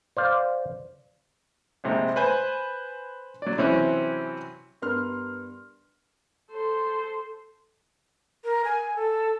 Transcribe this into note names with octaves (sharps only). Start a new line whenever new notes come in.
C5 D5 F5
A#1 G#2 C3
B4 C5 G#5
F#3 D5
C3 E3 F#3 C4 C#4
G2 B3 A#4 C6 F6
A4 C5
A#4
G#5
A4